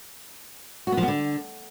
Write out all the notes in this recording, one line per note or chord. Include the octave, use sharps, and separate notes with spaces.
F#4
B3
F3
B3
D3